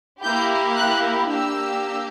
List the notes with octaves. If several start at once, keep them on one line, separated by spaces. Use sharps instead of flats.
A#3 E4 G4 G6
F#6
A#3 D4 G4 E6